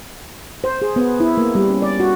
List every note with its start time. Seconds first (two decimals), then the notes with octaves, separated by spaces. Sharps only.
0.64 C5
0.82 G#4
0.96 B3
1.20 E4
1.38 A#3
1.55 G3
1.69 C#4
1.82 D5
2.00 F#4